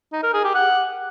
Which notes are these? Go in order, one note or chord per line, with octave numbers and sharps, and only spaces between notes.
D#4
A#4
G#4
G4
F#5